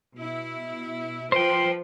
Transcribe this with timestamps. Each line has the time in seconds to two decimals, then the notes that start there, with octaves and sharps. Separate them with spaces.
0.16 B2 E4
1.32 F3 B4 C5 G5